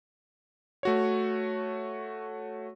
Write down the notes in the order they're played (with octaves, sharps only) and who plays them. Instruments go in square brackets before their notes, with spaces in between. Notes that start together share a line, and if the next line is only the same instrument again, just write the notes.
[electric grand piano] A3 F#4 C#5